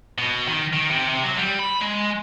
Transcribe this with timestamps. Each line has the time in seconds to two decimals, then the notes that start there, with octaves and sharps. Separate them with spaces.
0.19 B2
0.48 D#3
0.73 D#3
0.91 C3
1.08 C3
1.24 F#3
1.38 G3
1.60 B5
1.82 G#3